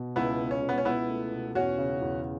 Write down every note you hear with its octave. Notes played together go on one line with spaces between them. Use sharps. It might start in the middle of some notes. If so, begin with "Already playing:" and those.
Already playing: B2
C#2 B3 E4
B2
C#4
C#2
B3
C#4
B2 B3 E4
A3
B2
E2 C#4 F#4
C#3
E2